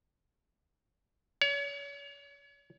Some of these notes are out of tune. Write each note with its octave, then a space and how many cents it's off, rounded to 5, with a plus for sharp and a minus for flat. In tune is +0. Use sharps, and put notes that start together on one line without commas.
C#5 +35